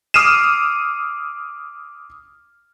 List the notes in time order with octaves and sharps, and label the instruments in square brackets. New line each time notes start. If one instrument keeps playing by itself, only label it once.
[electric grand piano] D6 D#6 F6 C7 D#7 E7